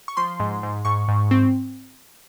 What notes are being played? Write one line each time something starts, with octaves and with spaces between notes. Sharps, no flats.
C#6
F3 C6
G#2
G#2
G#2 C#6
G#2
C4